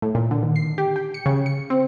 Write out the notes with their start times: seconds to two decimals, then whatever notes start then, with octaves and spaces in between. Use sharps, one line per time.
0.02 A2
0.15 A#2
0.31 D3
0.43 D#3
0.56 C7
0.78 G4
0.96 G5
1.14 C#7
1.26 C#3
1.46 C#7
1.70 C4